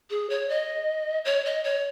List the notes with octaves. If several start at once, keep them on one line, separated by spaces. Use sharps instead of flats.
G#4
C#5
D#5
C#5
D#5
C#5